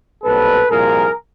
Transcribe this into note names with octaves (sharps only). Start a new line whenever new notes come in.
B1 A#2 G3 C4 A4 B4
C2 A#2 F3 G#4 A#4